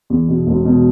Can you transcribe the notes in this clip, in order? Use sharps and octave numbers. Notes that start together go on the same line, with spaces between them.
E2
B2
E1
B2